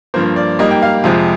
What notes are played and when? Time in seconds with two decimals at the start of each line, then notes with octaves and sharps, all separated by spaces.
0.14 G2 F3 A#3 C5
0.36 D5
0.59 G#2 G3 A#3 D#5
0.71 G5
0.82 F5
1.04 F2 C3 F3 G#3